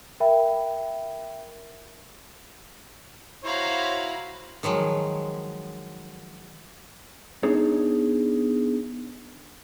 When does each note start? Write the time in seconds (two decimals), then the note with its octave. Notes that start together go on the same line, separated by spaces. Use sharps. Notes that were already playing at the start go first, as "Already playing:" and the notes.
0.20 A#4 E5 G5 B5
3.44 E4 F#4 C5 C#5 F5 A#5 B5
4.63 D#3 F3 F#3 G#3
7.43 B3 D4 D#4 G#4 C#5